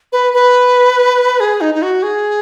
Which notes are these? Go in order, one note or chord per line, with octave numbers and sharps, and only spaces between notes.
B4
B4
G#4
D#4
D#4
F#4
G#4